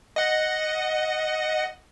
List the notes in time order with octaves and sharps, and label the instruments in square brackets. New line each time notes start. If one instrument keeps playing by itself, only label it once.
[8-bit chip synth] D#5 F#5